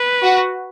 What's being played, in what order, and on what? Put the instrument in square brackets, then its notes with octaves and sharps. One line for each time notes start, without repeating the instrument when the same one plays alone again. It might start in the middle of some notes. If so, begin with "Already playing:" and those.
Already playing: [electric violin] B4
[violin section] F#4